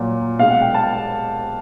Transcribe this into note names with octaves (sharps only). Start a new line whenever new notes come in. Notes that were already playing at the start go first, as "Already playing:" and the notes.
Already playing: A#2 F#3 A#3
B2 G#3 F5
F#5
G5
A5